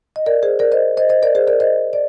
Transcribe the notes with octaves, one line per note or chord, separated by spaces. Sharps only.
D#5
A#4 D5
G#4 C5
A#4 D5
C5 D#5
C5 D#5
C5 D#5
A#4 D5
G#4 C5
A#4 D5
C5 D#5
D5